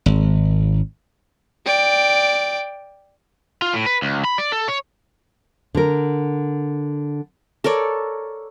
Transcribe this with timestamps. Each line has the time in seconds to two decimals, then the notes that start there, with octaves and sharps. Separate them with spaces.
0.06 G#1
1.66 D5 G5
3.62 F4
3.74 A2
3.86 B4
4.02 C#2
4.24 B5
4.38 D5
4.52 A4
4.68 C#5
5.75 D3 A#4
7.64 A4 A#4 C#5 D5